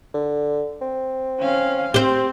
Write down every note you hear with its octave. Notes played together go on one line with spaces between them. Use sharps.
D3
C4
C#4 F5
C4 G4 C5